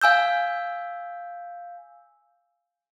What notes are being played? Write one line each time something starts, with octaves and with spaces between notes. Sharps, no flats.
F5 G#5 E6 G6